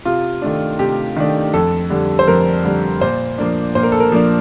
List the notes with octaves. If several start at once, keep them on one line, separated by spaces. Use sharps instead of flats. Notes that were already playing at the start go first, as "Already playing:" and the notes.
C3 F4
D#3 A3 D4
C3 G4
D#3 A3 D4
F2 A4
D3 G3
C5
F2 A#4
D3 G3
A#2 C5
F3 A#3 D4
A#2 C5
A#4
A4
A#4
F3 A#3 D4